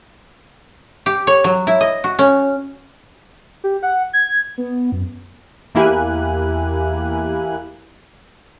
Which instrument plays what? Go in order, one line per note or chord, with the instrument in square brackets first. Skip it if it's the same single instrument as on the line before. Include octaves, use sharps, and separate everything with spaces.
[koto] G4
C#5
F#3
E4
D#5
F#4
C#4
[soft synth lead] G4
F#5
G#6
B3
F#2
[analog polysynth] E2 A#3 E4 G4 G#5 F#6